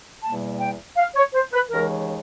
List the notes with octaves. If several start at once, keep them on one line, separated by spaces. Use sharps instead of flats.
E2 B2 G3 A#3 A5
G5
F5
C#5
C5
B4
D#2 C#3 E3 G#3 A#4